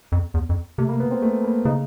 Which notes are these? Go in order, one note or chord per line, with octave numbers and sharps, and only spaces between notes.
F2
E2
F2
C3 A3
A#3
B3
C4
A3
A#3
C#3 D#4